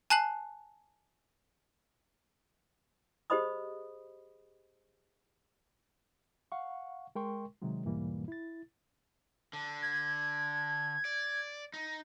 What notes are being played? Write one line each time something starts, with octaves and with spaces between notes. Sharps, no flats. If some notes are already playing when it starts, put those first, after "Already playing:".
G#5 A5 F#6 C7 F#7
G4 G#4 C5 D#5 B5 D#6
F5 F#5 C#6
G#3 A#4 G5 C6 C#6
C3 D#3 F#3 G#3
E2 G#2 B2 E3 G3 A#3
E4 A6
D3
G#6
D5
D#4